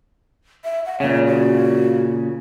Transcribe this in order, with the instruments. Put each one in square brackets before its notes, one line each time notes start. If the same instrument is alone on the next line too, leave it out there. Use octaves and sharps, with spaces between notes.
[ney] E5
F#5
[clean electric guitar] A#2 C#3 [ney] C#5
[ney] F#4